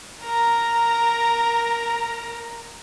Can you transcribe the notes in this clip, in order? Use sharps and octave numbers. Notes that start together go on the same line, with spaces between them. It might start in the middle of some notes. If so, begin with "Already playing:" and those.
A#4 A#5